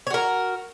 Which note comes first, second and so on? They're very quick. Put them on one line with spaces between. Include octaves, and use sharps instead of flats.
C#5 F#4 A#4